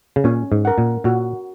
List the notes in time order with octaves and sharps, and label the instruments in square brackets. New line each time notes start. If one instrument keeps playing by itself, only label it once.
[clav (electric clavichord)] C#3
[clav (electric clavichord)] A#2 [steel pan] C#4
[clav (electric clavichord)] G#2
[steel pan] A#4 F#5
[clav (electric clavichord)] A#2
[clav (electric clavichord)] A#2 [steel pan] F#4